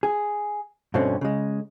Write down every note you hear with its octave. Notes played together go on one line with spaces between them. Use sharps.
G#4
G2 B2 D3 A3 C4 C#4
C#3 G#3